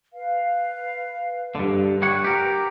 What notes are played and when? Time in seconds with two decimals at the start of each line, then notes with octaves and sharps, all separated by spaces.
0.13 B4 F5
1.55 G2 D3 B4
2.02 G3 C#5 F#5
2.24 G4 A#4